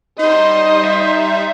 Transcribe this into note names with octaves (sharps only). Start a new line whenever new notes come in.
G3 D#4 C5 D#5
E5